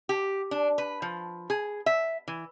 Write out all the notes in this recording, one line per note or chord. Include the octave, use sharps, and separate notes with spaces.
G4
D4
B4
F3
G#4
E5
E3